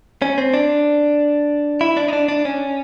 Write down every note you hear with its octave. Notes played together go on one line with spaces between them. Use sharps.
C#4
C4
D4
E4
D4
D#4
D4
D4
C#4